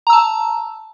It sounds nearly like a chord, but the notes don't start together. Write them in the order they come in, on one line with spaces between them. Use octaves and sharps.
A#5 E6 A5